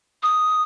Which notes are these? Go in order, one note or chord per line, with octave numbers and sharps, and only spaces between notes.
D#6